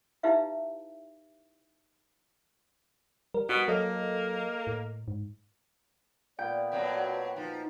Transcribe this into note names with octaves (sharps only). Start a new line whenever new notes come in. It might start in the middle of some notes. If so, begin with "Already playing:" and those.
D#4 E4 G4 B4 E5 F5
G3 A#4
B2 F#4 D#6
F#3 A#3 A4 D#5
A2
G#2
A#2 B3 D5 G5
B2 F#3 C4 G4
F3 D#4